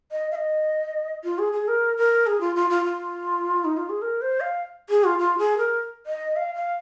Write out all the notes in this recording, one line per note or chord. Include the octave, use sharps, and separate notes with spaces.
D#5
F5
D#5
F4
G#4
G#4
A#4
A#4
G#4
F4
F4
F4
F4
D#4
F4
G#4
A#4
C5
F5
G#4
F4
F4
G#4
A#4
D#5
F5
F5